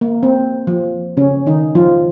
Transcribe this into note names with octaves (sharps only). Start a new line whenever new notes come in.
A#3
C4
F3
C#3 C#4
D#3 D#4
F3 F4